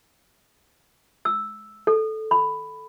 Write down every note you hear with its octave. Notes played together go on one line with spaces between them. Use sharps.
E6
A4
B5